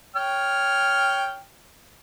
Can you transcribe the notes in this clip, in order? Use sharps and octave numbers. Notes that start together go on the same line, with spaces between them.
C#5 G5 F6